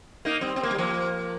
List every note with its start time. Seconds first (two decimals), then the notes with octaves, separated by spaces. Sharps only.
0.25 A#3 D#4
0.41 G3 C4
0.56 C4
0.63 A#3
0.71 G3
0.78 F3 A#3